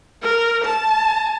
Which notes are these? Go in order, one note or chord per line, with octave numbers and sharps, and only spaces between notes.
A#4
A5